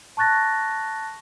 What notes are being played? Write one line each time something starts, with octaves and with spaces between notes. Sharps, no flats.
A5 C#6 F#6 A6 A#6